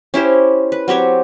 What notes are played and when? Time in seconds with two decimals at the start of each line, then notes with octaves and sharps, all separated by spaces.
0.14 C#4 E4 G4 C5
0.72 B4
0.88 F#3 C4 G4 C#5